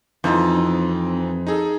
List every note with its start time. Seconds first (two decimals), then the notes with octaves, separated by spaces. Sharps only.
0.24 F2 E3 D#4 F4
0.58 C4
1.47 D#4 G#4 A4